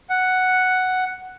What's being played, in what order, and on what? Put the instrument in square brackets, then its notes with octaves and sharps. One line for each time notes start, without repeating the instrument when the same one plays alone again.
[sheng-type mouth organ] F#5